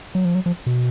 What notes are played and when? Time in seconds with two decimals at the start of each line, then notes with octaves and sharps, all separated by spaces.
0.15 F#3
0.25 F3
0.35 F#3
0.46 F3
0.66 B2